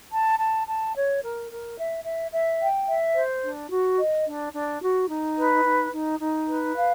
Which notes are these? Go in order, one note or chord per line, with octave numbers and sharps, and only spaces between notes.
A5
A5
A5
C#5
A#4
A#4
E5
E5
E5
G5
E5
C5
D4
F#4
D#5
D4
D4
F#4
D#4
B4
D#4
D#4
D#4
B4
F5